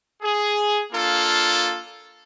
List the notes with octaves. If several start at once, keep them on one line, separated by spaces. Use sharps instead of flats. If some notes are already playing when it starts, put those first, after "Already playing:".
G#4
A#3 D4 F4 A4